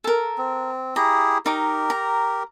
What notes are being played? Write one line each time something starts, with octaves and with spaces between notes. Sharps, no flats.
A4 A#4
C4
E4 G4 G#4 A#5
D#4 G4 A#4 D6
A#5